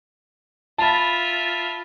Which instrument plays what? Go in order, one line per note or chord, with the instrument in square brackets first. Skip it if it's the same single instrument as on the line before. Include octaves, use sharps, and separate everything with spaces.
[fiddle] F4 E5 [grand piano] A5 B5